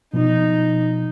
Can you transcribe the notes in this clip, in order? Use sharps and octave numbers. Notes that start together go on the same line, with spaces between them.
B2 F3 D#4